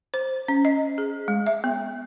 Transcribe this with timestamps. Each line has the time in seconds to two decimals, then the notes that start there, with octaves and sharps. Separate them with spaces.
0.14 C5
0.48 C#4
0.65 D#5
0.98 G#4
1.28 G#3
1.47 E5
1.64 B3